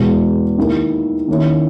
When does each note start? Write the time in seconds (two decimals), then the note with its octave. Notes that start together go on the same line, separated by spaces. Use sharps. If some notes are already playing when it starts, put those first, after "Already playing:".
Already playing: E2 B2 G#3
0.57 D#2 D#3 A#3 E4 A#4
1.28 D#3 A#3 C#4 E4